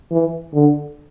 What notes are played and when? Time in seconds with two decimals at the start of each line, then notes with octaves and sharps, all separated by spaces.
0.12 E3
0.54 D3